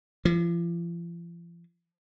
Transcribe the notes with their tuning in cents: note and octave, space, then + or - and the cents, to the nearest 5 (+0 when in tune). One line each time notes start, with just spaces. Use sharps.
F3 -40